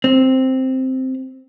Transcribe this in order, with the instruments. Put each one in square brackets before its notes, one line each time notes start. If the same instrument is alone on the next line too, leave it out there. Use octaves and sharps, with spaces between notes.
[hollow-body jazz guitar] C4